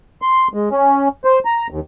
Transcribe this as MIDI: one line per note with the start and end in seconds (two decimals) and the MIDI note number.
0.22 0.48 84
0.54 0.69 56
0.72 1.08 61
1.25 1.39 72
1.45 1.67 82
1.70 1.80 39